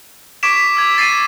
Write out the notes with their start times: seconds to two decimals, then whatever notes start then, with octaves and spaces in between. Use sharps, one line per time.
0.43 C#6 D6 G#6 B6 D7 E7
0.56 B6 E7
0.77 E6 G#6 F7
0.97 G#6 A6 C7 D7 D#7
1.12 A6